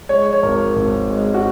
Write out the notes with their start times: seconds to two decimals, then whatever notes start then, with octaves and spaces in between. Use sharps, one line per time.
0.09 G#3 C#5
0.33 C#5
0.43 G#1 A#4
0.76 G#1
1.09 G#3
1.34 F#4